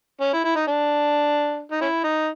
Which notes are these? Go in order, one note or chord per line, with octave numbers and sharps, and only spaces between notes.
C#4
E4
E4
D#4
D4
D#4
C#4 E4
D#4